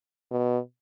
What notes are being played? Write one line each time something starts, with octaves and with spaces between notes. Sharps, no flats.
B2